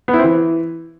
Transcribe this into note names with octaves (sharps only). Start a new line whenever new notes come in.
B3
E4
C4
E3